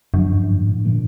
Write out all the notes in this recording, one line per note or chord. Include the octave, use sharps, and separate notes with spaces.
F#2 D3 F3 A#3 D4
G2
G#2
A2
A#2 D3 F3 A#3 D4